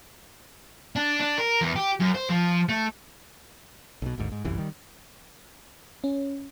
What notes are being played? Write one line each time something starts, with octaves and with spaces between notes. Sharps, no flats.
D4
D4
A#4
E2
G4
F#2
C5
F3
A3
B1 B2
G#1 D2 G#2
G#2
G1 C2 F#2 E3
D#3 G3
C#4